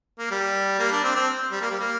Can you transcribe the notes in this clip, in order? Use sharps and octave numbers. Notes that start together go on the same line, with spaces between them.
A#3
G3
A#3
D4
C4
C4
G3
A#3
G3
A#3